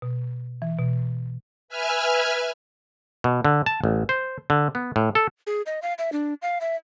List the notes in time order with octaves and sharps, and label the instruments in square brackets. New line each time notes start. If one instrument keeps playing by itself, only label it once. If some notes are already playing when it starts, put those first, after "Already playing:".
[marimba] B2
E3
B2
[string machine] B4 E5 G#5 F6
[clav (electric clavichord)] B2
D3
A5
A1
C5
D3
B3
A2
A4
[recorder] G#4
D#5
F5
E5
D4
F5
E5